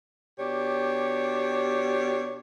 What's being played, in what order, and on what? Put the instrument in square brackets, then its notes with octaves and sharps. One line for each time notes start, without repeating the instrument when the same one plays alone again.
[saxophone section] B2 D4 G4 C#5